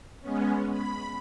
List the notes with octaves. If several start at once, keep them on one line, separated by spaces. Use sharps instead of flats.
G#3 B3 C#4
B5